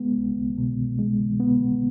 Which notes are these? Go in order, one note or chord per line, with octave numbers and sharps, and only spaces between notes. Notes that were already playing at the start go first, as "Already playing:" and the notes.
Already playing: G#3 B3
C2
B2
G#3
B3